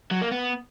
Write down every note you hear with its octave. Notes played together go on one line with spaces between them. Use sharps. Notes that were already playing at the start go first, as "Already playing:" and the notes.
F#3
A#3
B3